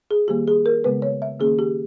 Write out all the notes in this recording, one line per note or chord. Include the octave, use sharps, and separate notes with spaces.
G#4
D#3 G3 A#3 G4
G#4
A#4
C#3 G#3 B3 B4
C#5
E5
D#3 A#3 C#4 G#4
G4